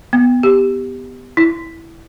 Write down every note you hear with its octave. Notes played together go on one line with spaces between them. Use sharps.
B3
G4
E4